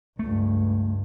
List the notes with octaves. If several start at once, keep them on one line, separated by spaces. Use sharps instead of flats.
C#2 G2 A3